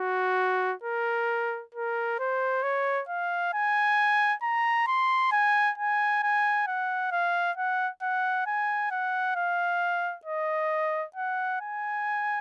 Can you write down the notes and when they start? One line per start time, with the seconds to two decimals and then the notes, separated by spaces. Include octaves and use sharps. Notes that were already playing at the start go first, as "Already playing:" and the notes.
Already playing: F#4
0.83 A#4
1.74 A#4
2.19 C5
2.63 C#5
3.09 F5
3.54 G#5
4.43 A#5
4.87 C6
5.32 G#5
5.78 G#5
6.23 G#5
6.67 F#5
7.11 F5
7.57 F#5
8.02 F#5
8.47 G#5
8.91 F#5
9.36 F5
10.25 D#5
11.16 F#5
11.61 G#5